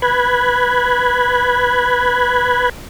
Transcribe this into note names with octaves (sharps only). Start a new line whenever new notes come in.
B4 B5 F#6 G#6